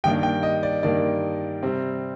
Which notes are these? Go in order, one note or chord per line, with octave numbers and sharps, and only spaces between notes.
G2 D#3 A#3 D4 G5
G5
D#5
D5
G2 D#3 A#3 D4 D5
C3 G3 C4